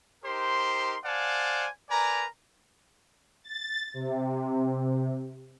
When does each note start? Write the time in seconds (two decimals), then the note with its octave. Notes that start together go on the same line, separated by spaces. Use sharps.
0.24 D#4 G4 A#4 C5 C6
1.05 C5 D5 F5 F#5 G#5 A5
1.90 A#4 B4 D5 G#5 A#5
3.44 A6
3.94 C3